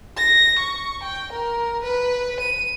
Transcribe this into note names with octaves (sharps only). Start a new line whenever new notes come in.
A#6
C#6
G5
A#4
B4
D#7